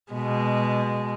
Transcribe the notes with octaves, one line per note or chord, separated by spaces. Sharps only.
B2 G#3